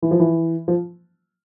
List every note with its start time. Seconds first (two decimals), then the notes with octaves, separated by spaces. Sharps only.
0.02 E3
0.11 F3
0.20 E3
0.68 F3